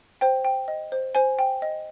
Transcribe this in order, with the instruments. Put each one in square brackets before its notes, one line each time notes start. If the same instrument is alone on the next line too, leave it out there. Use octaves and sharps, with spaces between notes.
[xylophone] C5 G5
G5
D#5
C5
C5 G#5
G5
D#5